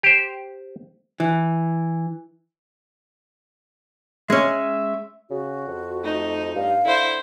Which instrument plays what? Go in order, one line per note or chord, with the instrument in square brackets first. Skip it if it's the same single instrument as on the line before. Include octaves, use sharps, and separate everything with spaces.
[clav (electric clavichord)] G4 C5
[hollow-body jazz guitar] E3
[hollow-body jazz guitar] G#3 C#4 [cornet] E5
[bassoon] C#3 [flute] F#4
[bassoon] F2
[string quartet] A3 D#4
[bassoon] G2 [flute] F5
[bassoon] D3 [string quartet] E4 C5